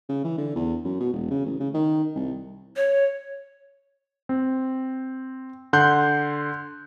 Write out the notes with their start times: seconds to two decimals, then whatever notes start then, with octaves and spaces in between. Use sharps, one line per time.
0.09 C#3
0.24 E3
0.38 D3
0.56 E2
0.84 F#2
1.00 B2
1.13 E1
1.31 C#3
1.46 A1
1.60 C#3
1.74 D#3
2.15 C2
2.76 C#5
4.29 C4
5.73 D3 F#5 C6 F#6 G6